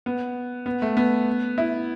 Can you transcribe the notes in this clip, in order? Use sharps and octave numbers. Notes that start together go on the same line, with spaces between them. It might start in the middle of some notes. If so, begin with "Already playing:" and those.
B3
B3
A3
B3
E4